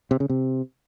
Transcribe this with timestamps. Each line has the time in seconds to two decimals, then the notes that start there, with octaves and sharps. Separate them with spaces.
0.11 C3
0.20 C#3
0.30 C3